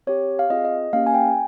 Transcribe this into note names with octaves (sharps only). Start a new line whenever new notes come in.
C4 G4 C#5
F5
C4 F4 G#4 D#5
D#5
A#3 C#4 G4 F5
G#5
G5